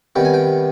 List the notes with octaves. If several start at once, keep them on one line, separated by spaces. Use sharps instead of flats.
C3 D#3 G3 B3 G5
G#5
G5